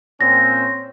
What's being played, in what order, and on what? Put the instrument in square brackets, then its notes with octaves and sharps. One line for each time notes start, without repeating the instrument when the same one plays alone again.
[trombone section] A#2 C4 C#4 [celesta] A#6